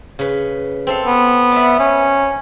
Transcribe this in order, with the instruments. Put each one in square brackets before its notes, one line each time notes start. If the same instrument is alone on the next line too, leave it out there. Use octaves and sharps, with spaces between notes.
[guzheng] C#3 B4
C4 A4 F5
[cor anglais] B3
[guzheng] D5 E5
[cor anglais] C#4